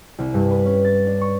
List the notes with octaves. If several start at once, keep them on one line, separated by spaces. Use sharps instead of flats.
C2
G2
B4
C#4
A6
D4
C#6